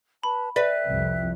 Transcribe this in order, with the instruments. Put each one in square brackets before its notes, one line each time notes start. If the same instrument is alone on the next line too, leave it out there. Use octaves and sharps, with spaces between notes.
[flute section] B4 A5 [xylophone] B5
[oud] B4 [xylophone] D5 [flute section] E5 G5 F#6
[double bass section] C2 F2